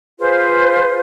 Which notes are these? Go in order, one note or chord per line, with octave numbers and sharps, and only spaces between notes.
F4 G#4 B4 C5